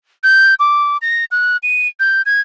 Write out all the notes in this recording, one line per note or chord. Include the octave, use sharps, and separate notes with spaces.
G6
D6
A#6
F#6
D#7
G6
G#6